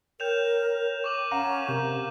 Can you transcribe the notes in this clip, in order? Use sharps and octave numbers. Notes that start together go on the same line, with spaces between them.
A#4 C#5 G5 G6 E7 F7
C#6 D6 F#7
C#4 F5 F#5 A#5 E7
C3 A#4 F5 A#5 G6